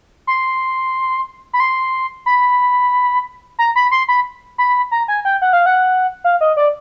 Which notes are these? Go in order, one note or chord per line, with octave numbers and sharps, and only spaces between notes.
C6
B5
C6
B5
A#5
B5
C6
B5
B5
A#5
G#5
G5
F#5
F5
F#5
F5
D#5
D5